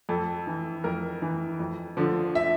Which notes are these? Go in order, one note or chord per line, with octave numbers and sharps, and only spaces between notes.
F2 A4
E3
F2 A#4
E3
F2
D3 F3
E5